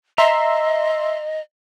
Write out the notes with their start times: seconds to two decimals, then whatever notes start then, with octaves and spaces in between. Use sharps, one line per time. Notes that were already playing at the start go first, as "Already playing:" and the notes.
0.18 D#5 E5 A#5 C6